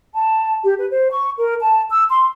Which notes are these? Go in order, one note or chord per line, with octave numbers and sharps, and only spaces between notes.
A5
G4
B4
C5
C#6
A#4
A5
E6
C6